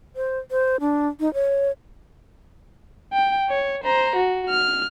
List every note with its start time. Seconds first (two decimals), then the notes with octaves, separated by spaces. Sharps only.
0.16 C5
0.51 C5
0.80 D4
1.20 D#4
1.34 C#5
3.13 G5
3.50 C#5
3.84 C5 A#5
4.16 F#4
4.49 F6